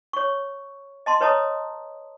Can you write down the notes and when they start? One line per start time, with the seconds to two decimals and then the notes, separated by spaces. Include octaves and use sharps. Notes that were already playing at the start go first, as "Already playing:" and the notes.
0.13 C#5 C#6
1.06 D#5 A5 C6
1.21 B4 C#5 D#5 A5 A#5 D#6